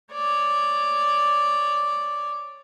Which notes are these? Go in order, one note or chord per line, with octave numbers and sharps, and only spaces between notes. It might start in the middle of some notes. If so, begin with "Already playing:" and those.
C#5 D5